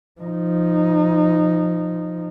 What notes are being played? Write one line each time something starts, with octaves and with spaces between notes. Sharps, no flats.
F3 D#4